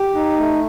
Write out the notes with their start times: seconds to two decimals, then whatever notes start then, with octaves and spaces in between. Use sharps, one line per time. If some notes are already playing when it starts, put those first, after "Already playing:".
Already playing: G4
0.15 D#4
0.37 A3